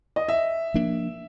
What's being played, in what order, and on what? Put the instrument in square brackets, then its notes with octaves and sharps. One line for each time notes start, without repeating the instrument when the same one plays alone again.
[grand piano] D#5
E5
[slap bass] F3 A#3 D4